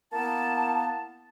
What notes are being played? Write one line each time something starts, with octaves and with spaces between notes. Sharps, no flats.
A#3 B3 E4 A5